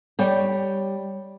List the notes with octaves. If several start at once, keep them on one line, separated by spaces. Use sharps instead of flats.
G3 C#5 G5